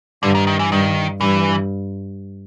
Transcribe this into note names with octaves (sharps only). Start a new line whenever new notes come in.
G2 D3
D#3
D#3
E3
G2 D#3
G2 E3